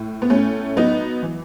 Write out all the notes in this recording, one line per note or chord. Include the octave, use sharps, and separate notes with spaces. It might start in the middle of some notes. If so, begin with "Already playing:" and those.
Already playing: A2
B3
A2 A3 C#4
F#3 B3 D#4
E3